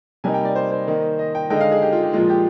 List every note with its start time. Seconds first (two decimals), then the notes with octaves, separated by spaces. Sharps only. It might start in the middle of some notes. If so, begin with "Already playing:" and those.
0.24 C3 G3 A#3 D#4 G#5
0.34 G5
0.45 D5
0.55 C5
0.71 C5
0.88 D#3 A#3 D#4
1.19 D#5
1.35 G5
1.50 D3 G#3 D#4 G5
1.56 D#5
1.61 F5
1.71 G#4
1.82 G4
1.92 F4
2.03 G4
2.13 A#2 F3 G#3 F4
2.30 G4